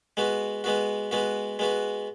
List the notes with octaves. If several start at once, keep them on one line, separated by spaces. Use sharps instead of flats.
G#3 B3 F#4
G#3 B3 F#4
G#3 B3 F#4
G#3 B3 F#4